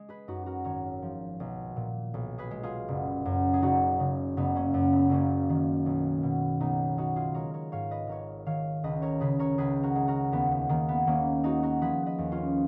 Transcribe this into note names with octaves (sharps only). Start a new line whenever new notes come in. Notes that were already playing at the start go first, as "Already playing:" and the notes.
Already playing: G#3
G#4 B4
F#2 D#4 F#4
F#4 A#4
G#1 A#4 C#5
F3
B1
A#2
B1
G#4 B4
G#3
F4 G#4
F#1
F#2
G#4
F#1 D#4 F#4
C#3
F#1 B3 D#4
A#3 C#4
F#2
B3
F#1 A#3 C#4
D#3
B1
B2
B1 B3 D#4
F#3 D#4 F#4
F4 G#4
G#3 A#4 C#5
A#4 C#5
G#2 C#5 F5
B4 D#5
G#1 A#4 C#5
D#3 C#5 F5
C#2 B4 D#5
A#4 C#5
C#3 G#4 B4
A#4 C#5
C#2 G#4 B4
F#4 A#4
G#3
F#4 A#4
D#2 B3
B3
D#3 A#3
B3
D#2 A#3 C#4
G#3 D#4 F#4
F#4 A#4
F3 G#4 B4
B4 D#5
D#2
C#4 F4